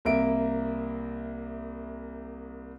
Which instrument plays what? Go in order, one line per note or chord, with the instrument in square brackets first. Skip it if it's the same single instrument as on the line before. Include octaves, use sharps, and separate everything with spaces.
[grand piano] C2 A#3 E5 D7